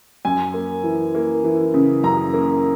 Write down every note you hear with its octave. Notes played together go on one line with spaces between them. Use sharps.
F#2 G#5
A#3
E3
A#3
E3
C#3
F#2 A#5
A#3